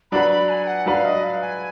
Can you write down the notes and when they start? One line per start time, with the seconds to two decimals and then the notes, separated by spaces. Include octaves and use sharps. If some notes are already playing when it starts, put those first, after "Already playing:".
0.11 F#3 D4 F#4 B4 B5
0.30 B5
0.49 G#5
0.67 F#5
0.86 F#3 D4 F#4 B4 F5
1.05 D#5
1.24 F5
1.42 G#5